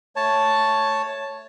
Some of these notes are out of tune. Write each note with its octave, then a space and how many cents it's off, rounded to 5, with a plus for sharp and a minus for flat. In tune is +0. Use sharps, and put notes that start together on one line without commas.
A3 +0 C#5 +0 A5 +0